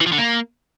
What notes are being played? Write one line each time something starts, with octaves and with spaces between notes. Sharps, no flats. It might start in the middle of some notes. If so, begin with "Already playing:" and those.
E3
F3
D3
A#3